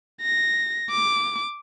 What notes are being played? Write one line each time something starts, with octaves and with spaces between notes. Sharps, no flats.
A#6
D6